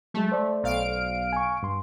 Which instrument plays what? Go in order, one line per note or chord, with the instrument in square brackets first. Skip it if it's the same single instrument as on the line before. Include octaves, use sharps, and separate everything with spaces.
[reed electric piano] F#3 G#3 [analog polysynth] A3
[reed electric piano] C5 D5
[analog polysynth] B1 F5 D7
[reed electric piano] G#5 C#6
G2 C6